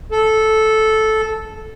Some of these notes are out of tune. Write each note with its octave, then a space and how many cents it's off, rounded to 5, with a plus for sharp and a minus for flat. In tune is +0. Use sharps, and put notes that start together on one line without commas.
A4 -10